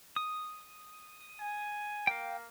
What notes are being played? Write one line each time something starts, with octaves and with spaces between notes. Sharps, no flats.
D#6
G#5
A#3 F5 G5